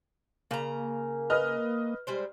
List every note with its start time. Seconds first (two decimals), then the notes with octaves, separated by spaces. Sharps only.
0.51 C#3 A#3 A#5
1.30 B4 D#5 F6
2.07 G3 G#3 C5